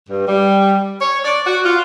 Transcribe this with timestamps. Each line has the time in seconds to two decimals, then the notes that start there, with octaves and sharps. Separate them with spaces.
0.09 G2
0.27 G3
1.00 C#5
1.24 D5
1.46 F#4
1.65 F4